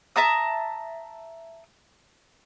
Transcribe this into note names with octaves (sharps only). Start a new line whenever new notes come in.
E5 A5 A#5 D#6